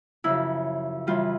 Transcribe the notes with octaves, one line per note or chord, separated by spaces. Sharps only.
F#2 C#3 F3 E4
F#2 C#3 E3 G3 F4